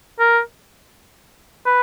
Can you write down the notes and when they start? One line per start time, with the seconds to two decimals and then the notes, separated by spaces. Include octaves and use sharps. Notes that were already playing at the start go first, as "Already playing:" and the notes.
0.19 A#4
1.66 B4